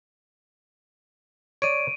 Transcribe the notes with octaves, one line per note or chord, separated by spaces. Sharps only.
C#5 D5 D7 D#7